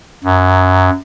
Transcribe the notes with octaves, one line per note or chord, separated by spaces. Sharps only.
F#2